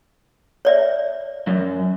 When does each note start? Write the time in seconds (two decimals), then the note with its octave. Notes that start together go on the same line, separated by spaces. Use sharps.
0.65 C#5 D5 E5
1.47 F#2